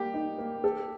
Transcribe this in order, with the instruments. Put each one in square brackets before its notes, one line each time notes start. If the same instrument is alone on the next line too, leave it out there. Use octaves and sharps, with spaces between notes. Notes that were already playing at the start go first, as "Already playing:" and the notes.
Already playing: [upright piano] G3 A#3 [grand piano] G4
[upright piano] D#4
A#3
A4